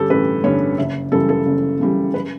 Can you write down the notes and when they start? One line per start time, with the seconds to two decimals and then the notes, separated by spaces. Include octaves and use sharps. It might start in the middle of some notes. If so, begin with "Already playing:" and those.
Already playing: G2 D3 G3 C#4 G4 A4
0.10 A1 B4
0.44 G2 D3 G3 C#4 C#5
0.78 F#1 E5
1.12 F#2 C#3 E3 G3 A4
1.29 A4
1.46 F#1
1.80 F#2 C#3 E3 G3
2.14 F#2 B4